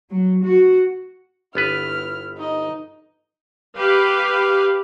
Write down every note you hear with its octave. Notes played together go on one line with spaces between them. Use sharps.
F#3
F#4
G1 B3 E4 B4 F6
D#4 D#5
G4 B4 F5